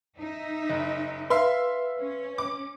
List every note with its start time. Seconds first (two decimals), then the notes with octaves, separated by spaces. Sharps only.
0.20 D#4 E5
0.69 F#1 D#5
1.30 B4 E5 F5 C6
1.98 C#4
2.38 D6